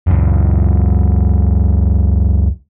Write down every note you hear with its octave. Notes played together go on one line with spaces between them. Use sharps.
C#2 F#2